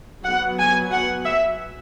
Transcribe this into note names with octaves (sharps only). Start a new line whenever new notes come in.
F#3 B3 F#5
G#5
F#5
E5